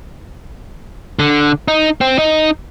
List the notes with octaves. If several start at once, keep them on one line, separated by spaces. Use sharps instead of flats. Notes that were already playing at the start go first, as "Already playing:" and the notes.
D3
D#4
C4
D#4